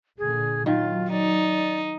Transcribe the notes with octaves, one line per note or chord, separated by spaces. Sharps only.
A#2 D3 G#4
D#3 F#3 F4
D#4 D5